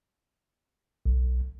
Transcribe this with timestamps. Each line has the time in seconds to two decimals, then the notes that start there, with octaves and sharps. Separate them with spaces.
1.06 B1